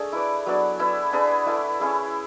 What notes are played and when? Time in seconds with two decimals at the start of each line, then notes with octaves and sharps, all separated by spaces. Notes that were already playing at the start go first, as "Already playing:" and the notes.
Already playing: A3 D4 G#4
0.13 E4 B4 D5
0.46 F#3 B3 D4
0.79 E4 B4 E5
1.13 D4 G#4 B4 E5
1.46 A3 E4 B4
1.80 C#4 E4 G#4